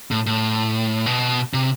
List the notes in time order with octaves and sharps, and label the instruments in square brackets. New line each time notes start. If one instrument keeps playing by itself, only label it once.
[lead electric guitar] A2
A2
B2
C3